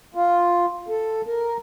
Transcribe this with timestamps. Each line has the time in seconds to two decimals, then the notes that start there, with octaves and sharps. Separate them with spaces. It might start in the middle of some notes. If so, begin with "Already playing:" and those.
0.15 F4
0.88 A4
1.26 A#4